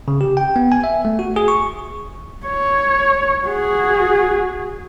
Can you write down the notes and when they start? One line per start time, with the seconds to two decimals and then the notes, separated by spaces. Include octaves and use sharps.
0.08 C#3
0.21 G4
0.37 G5
0.56 B3
0.72 G#5
0.84 E5
1.05 A3
1.19 F#4
1.36 G#4
1.48 C#6
2.47 C#5
3.45 F#4 G#4